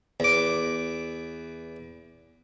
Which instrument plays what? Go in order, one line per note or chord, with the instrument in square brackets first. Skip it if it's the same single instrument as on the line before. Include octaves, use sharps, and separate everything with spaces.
[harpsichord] E2 D6